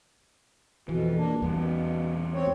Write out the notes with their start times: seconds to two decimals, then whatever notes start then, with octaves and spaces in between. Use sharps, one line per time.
0.89 F2 B2 E3
1.18 A#3 D4
1.42 E2 B2 G3
2.35 C4 C#5